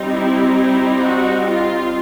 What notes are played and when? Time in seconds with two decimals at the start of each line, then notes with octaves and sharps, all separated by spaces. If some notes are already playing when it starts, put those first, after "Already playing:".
Already playing: G3 C4 D#4
0.10 E4
0.56 E4
1.01 F#4
1.48 F4